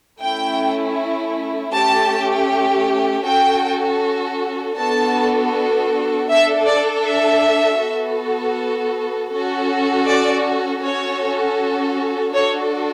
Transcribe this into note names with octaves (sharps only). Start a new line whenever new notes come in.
A3 C#4 E4 G5
A3 C#4 G4 A5
C#4 F#4 A4 G5
B3 D4 F#4 A4 A5
D4 A4 E5
D5
E5
B3 F#4 A4
C#4 F#4 A4
D5
C#4 F#4 A4 C#5
D4 F#4 A4 C#5